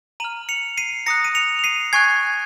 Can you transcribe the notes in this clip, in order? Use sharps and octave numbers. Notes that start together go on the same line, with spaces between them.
A#5 F6 D#7 F#7
C#7 F7
C7 D#7
A#5 D#6 F#6 A#6 C#7
D#7
C#7 F7
F7
C7 D#7
G#5 C#6 F#6 G#6 C7